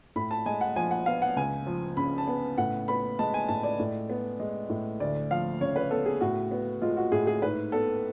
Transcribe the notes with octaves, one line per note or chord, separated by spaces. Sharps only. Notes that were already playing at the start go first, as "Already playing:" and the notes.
A2 B5
A5
G#3 G#5
F#5
F3 G#5
F#5
B3 F5
F#5
C#2 G#5
F3
C#3 B5
A5
B3
A2 F#5
B3 B5
G#3 A5
G#5
A2 A5
D5
A2
B3
G#3
A2
D2 D5
F3 F5
C#3 C#5
B4
B3 A4
G#4
A2 F#4
B3
G#3 F4
F#4
A2 G#4
G#4
G#2 B4
B3 A4